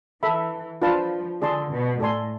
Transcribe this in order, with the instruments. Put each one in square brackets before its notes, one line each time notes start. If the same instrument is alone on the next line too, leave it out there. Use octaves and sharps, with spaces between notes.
[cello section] E3 [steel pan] A4 E5 B5
[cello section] F3 [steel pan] D4 F4 B4 F5 A5
[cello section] D3 [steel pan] G#4 D5 A5 C6
[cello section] B2
[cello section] A2 [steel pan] A4 D5 G#5 C6